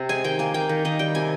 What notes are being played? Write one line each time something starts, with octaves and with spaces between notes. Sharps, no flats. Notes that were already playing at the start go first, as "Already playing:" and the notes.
Already playing: C3
G#3 G#5
D#3 G5
A#3 G#5
A#3 G5
D#3
D#3 D#5
G3 G5
C3 G#5